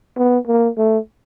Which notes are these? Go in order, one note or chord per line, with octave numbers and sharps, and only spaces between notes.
B3
A#3
A3